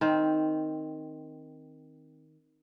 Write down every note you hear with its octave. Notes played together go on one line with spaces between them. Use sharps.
D#3 C4